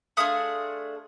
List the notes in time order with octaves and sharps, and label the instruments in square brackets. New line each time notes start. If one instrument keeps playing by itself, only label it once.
[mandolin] A3 D4 F4 G#4 D#6